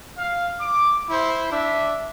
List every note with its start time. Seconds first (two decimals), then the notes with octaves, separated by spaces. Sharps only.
0.18 F5
0.60 D6
1.10 E4 C5
1.51 D4 E5